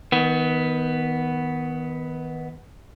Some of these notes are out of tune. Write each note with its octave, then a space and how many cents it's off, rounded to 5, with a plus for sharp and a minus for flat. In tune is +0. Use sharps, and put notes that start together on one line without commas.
D#3 +25 B3 +0